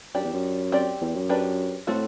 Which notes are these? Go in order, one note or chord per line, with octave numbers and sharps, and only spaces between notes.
F#2 D4 G4 D5
E2
F#2
C4 G4 D5
E2
F#2
D4 G4 B4 D5
A2 A3 C4 F#4 A4